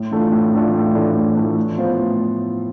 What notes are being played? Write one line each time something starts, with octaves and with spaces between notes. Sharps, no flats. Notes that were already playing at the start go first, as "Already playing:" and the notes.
Already playing: A2
E3 A3 D4 F4
A2
E3 A3 D4 F4
A2
E3 A3 D4 F4
A2
E3 A3 D4 F4
A2
F3 B3 F4 C5
A2